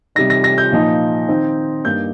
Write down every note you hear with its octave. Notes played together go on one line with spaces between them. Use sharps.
C3 G3 D#4 A#6
A#6
A#6
G6
A#2 F3 D#4
D#3 C4 D#4
G2 G3 A#3 D#4 G6